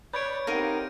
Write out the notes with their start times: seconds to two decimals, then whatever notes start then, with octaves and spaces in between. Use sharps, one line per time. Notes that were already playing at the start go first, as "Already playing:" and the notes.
0.13 B4 C#5 D5 B5 G6 G#6 D7
0.47 C4 D#4 G4 A#4 F5 F#5 A#6 D#7